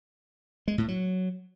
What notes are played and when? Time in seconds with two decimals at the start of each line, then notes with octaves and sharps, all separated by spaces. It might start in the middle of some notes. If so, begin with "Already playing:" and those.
0.68 G#3
0.78 A2
0.88 F#3